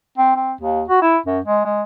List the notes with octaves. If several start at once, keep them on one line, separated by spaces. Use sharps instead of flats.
C4
C4
D#2
F#4
E4
F#2
G#3
G#3